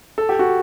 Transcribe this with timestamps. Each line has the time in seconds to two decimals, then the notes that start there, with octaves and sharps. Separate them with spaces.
0.18 A4
0.29 G4
0.39 F#4